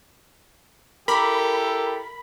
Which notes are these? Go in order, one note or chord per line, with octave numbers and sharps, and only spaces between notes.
E4 G4 A4 A#4 A#5 B5 D6